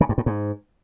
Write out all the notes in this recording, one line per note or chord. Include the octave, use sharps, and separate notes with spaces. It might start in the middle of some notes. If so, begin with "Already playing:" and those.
C#3
G2
A2
G#2